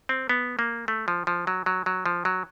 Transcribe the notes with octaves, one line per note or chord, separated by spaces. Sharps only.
C4
B3
A#3
A3
F3
F3
F#3
F#3
F#3
F3
F#3